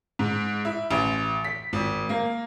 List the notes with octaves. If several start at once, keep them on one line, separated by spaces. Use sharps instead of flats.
G#2
E4
A1
B6
G#1
A#3